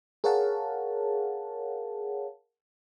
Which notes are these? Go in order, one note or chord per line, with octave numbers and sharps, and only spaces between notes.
G#4 A#4 C#5 F5 F#5 A5